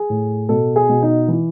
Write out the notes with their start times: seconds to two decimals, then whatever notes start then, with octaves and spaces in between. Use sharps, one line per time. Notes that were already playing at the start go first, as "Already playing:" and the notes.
Already playing: G#4
0.10 A2
0.49 B2 A4
0.76 G#4
0.89 B2
1.02 D#4
1.28 E3